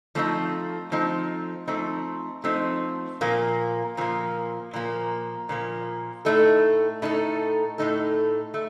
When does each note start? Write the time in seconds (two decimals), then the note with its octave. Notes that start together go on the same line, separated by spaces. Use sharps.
0.15 F3 A3 C4 D#4
0.92 F3 A3 C4 D#4
1.68 F3 A3 C4 D#4
2.44 F3 A3 C4 D#4
3.21 A#2 F3 A#3
3.97 A#2 F3 A#3
4.74 A#2 F3 A#3
5.49 A#2 F3 A#3
6.25 A2 A3 D#4 A4
7.02 A2 A3 D#4 A4
7.78 A2 A3 D#4 A4
8.54 A3